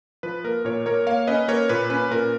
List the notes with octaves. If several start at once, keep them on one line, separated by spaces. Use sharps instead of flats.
F3 B4
A#3 A#4
A#2 A#4 C#5
A#3 A#4 C#5
A#3 C#5 F5
C#4 B4 D#5
A#3 A#4 C#5
A#2 B4
C#4 B4
A#2 A#4